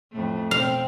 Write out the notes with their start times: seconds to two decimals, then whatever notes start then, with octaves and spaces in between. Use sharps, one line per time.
0.12 F2 A2 A3
0.51 B2 C4 F5